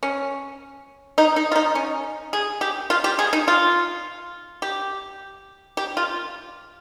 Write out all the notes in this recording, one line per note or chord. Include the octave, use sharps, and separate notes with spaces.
C#4
D#4
D#4
F4
D#4
C#4
G#4
G4
F4
G4
G#4
D#4
F4
G4
G4
F4